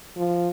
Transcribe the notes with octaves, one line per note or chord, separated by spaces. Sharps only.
F3